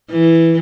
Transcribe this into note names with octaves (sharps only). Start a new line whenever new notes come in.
E3